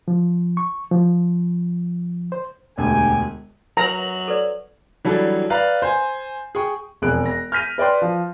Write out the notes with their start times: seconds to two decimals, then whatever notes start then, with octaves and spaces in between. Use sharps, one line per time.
0.08 F3
0.57 C#6
0.91 F3
2.32 C5
2.78 E1 D2 G4 G#4 G#5
3.77 F#3 A#4 B4 A#5
4.28 A4 B4 D5
5.05 E3 F#3 G3 D4 A4
5.50 B4 D5 F5 A#5
5.82 C5 G#5
6.55 G#4 G5 C#6
7.02 E1 F2 G#4 F#6 D7
7.26 A#6
7.52 F6 G6 B6 D#7
7.78 B4 D5 G5 C6
8.02 F3